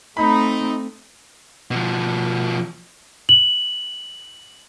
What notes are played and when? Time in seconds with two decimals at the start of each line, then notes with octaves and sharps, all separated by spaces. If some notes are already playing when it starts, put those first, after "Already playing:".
0.17 A3 C4 D#4 B5
1.71 B2 F3
3.29 F#7